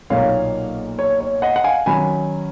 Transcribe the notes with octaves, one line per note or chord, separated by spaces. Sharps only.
B1 A#2 F#3 A#3 D#4 C#5 F5
C#5
C#5
D#5 F#5
F#5
F5 G#5
D#3 F#3 C#4 G#5 B5